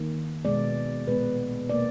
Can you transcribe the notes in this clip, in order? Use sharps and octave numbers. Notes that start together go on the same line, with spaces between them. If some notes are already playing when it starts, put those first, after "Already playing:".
Already playing: D#3 A#3
B2 G#3 B3 D5
A#2 G#3 B3 B4
B2 A#3 D5